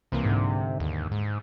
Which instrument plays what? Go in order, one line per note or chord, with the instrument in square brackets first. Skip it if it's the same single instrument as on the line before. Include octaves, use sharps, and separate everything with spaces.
[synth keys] C2 E3 A#3 [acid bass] C3
[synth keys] G#2 D3
[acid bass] D#2
G#2